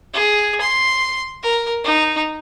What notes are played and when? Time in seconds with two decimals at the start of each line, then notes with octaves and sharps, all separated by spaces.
0.14 G#4
0.61 C6
1.43 A#4
1.84 D#4